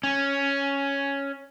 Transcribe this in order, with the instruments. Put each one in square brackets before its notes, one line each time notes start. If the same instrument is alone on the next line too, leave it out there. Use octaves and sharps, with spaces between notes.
[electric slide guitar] C#4